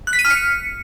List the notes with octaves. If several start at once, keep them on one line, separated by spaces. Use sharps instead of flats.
F#6
B6
D#7
F6
C#7